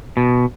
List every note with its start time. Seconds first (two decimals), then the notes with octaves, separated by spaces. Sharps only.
0.17 B2